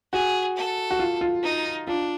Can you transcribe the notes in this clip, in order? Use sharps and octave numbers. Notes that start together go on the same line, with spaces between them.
F#4 G#4
A4
F#4
F4
F4
D#4
D4 F4